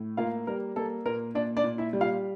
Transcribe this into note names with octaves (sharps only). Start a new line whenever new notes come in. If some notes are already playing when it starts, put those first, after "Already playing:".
Already playing: A2
A#3 F4 F5
G3 A#4
A#3 A4
A#2 A#4
A#2 D4 D5
D4 D5
A#2
E4 E5
G3
F4 F5